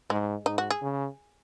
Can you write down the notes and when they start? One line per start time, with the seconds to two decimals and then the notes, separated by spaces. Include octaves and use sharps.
0.10 G#2 G#3
0.46 G#2 D#4
0.58 F#4
0.70 G#4
0.82 C#3